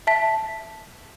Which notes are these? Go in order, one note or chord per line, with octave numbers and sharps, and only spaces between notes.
E5 A5 B6